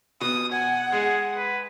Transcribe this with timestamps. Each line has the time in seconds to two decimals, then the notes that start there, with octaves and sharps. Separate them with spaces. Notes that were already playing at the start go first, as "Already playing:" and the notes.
0.21 B2 D#6
0.52 F#5 G#5
0.92 G#3 G#4
1.37 B4